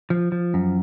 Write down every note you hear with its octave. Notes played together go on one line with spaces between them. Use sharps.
F3
F3
F#2